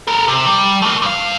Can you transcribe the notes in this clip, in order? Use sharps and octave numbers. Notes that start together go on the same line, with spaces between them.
A4 A#4
C3
G3
A3 A#3
G2 F5